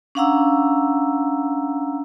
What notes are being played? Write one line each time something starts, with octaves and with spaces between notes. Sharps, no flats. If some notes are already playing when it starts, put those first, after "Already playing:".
C#4 D4 F5 F#5 A#5 E6